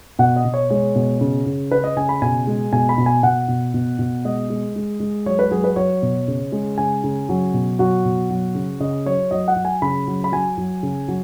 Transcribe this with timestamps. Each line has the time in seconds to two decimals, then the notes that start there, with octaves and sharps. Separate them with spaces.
0.19 B2 F#5
0.36 D#5
0.45 B2
0.54 C#5
0.70 G#3 C#5
0.95 B2
1.21 C#3
1.46 C#3
1.71 C#3 B4
1.84 D#5
1.96 C#3 G#5
2.09 B5
2.22 B2 G#5
2.47 G#3
2.73 B2 G#5
2.89 B5
2.98 B2
3.06 G#5
3.23 B2 F#5
3.48 B2
3.74 B2
3.99 B2
4.25 G#3 D#5
4.50 G#3
4.76 G#3
5.00 G#3
5.26 F#3 C#5
5.39 B4
5.51 F#3 G#4
5.64 B4
5.76 F#3 C#5
6.02 B2
6.28 C#3
6.52 G#3
6.78 C#3 G#5
7.04 C#3
7.29 F#3
7.54 B2
7.79 F#3 F#4
8.05 B2
8.30 F#3
8.55 C#3
8.80 C#3 D#5
9.06 F#3 C#5
9.31 F#3 D#5
9.48 F#5
9.56 F#3
9.65 G#5
9.82 C#3 B5
10.07 F#3
10.24 B5
10.32 F#3 G#5
10.58 F#3
10.83 C#3
11.08 F#3